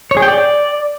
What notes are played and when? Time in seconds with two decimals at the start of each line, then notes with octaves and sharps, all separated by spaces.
0.11 C#5
0.17 G#4
0.22 G5
0.28 D5